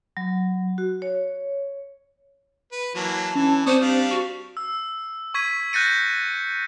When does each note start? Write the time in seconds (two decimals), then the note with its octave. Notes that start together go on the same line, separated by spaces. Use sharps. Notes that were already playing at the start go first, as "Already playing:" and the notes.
0.17 F#3
0.78 F#4
1.02 C#5
2.72 B4
2.95 E3 F#3 A#3 A5
3.35 E3 C#4
3.66 C4 C5 D5 C#6 D#6
3.81 G3 D4 F5
4.11 F#4 C#6
4.57 E6
5.34 C#6 G#6 B6 D#7
5.73 F#6 G6 A6 A#6 C#7 D#7